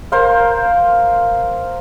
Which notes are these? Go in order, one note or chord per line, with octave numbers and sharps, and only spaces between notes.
A#4 C5 F5